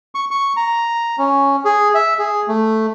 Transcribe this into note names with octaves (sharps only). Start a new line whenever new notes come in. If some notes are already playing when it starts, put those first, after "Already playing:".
C#6
C#6
A#5
C#4
G#4
E5
G#4
A3